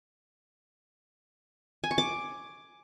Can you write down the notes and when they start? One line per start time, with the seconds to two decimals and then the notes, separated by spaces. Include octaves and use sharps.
1.84 G#5
1.91 C#6
1.98 D6